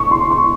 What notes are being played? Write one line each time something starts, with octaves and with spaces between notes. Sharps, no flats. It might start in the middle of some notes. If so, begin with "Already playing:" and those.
Already playing: C#6
C6
C#6